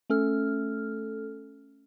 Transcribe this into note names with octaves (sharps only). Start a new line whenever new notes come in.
A3 C#4 A4 F6